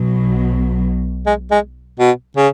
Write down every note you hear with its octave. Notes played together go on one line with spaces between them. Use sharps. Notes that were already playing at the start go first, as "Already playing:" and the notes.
Already playing: B1 B2 F#3
G#3
G#3
B2
C#3